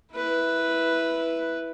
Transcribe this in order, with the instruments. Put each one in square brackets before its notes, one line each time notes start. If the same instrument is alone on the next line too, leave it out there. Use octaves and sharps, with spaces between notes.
[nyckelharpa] E4 B4